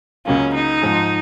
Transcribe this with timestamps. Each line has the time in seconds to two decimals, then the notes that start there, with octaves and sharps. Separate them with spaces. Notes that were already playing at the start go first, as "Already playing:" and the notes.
0.25 C#2 C#3 F#3 A#3 C#4 F4
0.54 D#4
0.81 G#2 F3 G#3